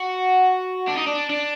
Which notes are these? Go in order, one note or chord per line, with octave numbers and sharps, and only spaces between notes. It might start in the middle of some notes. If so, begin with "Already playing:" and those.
Already playing: F#4
D4
D#4
D4
D4